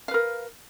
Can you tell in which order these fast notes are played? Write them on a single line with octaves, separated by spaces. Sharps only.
F5 B4 A#4